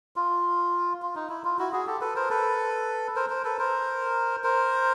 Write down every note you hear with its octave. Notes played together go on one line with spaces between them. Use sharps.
F4
F4
D#4
E4
F4
E4 F#4
F#4 G#4
G4 A4
A4 B4
A#4 C5
A4 B4
A#4 C5
A#4 C5
A4 B4
A#4 C5
A#4 C5